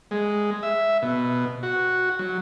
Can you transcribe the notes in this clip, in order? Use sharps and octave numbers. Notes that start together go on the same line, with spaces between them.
G#3
E5
B2
F#4
F#3